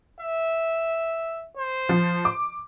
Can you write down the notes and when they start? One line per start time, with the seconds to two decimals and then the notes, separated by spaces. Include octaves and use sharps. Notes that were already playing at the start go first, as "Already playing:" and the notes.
0.20 E5
1.57 C5
1.89 F3
2.25 D6